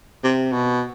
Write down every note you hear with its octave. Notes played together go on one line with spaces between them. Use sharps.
C3
B2